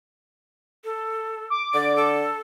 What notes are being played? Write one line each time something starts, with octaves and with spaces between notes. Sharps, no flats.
A4
D6
D3 D5
A4